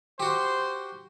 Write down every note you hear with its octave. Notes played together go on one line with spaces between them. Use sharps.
F#4 G4 C5